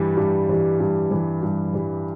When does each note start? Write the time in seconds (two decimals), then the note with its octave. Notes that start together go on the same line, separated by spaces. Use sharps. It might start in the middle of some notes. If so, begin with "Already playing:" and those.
Already playing: G2 E3 G3
0.17 G2
0.49 E3 G3
0.80 G2
1.11 E3 G3
1.43 G2
1.73 E3 G3